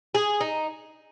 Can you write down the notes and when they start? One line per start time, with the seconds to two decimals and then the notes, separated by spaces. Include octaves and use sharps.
0.15 G#4
0.41 D#4